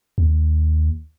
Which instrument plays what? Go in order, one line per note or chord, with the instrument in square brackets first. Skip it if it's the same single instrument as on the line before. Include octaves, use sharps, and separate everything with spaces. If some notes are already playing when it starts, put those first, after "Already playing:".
[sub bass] D#2